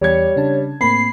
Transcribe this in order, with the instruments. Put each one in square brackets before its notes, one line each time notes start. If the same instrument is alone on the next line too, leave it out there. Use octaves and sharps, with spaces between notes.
[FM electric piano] E2 D6 C#7 [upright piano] G3 G#6 [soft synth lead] C#5
[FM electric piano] C#3 D4 A5
[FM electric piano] A2 A#3 C4 [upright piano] B5 [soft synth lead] C7